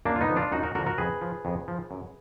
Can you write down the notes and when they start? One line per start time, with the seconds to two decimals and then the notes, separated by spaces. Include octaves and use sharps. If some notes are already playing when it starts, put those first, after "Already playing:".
0.05 F#2 A#3 D4
0.16 F4
0.21 B3 D#4
0.29 D3 F3
0.36 D4 F4
0.52 F#2 D#4 F#4
0.63 F#4 A#4
0.75 D3 F3 F#4 A#4
0.86 F#4 A#4
0.98 F2 G#4 B4
1.21 F3
1.45 F2
1.68 F3
1.91 F#2